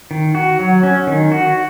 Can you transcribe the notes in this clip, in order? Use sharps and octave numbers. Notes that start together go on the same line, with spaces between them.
D#3
F#4
F#3
C#4
D#3
F#4